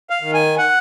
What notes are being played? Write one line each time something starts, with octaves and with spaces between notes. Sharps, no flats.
F5
D#3
G#5
F#5